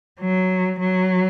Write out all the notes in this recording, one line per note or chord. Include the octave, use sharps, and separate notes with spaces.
F#3
F#3